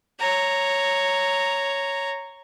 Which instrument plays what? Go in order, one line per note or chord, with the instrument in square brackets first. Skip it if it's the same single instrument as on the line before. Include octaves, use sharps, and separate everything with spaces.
[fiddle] C#5 A#5